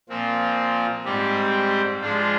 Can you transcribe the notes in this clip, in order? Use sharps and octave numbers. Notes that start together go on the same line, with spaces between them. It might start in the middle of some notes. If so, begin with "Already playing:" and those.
A#2 F3 C4 F4
G#2 G3 C4 G4
F3 G#3 D4 F4